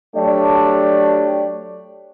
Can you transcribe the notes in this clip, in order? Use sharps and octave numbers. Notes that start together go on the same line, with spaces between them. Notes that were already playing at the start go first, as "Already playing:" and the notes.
F#3 A3 D4 G4 C#5 D5